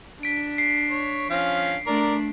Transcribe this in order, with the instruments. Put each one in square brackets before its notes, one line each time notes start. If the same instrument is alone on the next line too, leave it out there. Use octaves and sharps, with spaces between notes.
[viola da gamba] D4 [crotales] B6 D7
[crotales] C7
[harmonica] C#5
F3 C#4 F5
[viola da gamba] A3 D4 [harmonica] A#4 D5